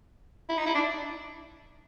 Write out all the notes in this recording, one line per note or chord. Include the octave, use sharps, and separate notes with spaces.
E4
D#4
E4
D4